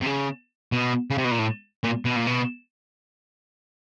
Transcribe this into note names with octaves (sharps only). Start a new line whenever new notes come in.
C3
C#3
B2
C#3
C3
B2
A#2
A2
A#2
B2
A#2
B2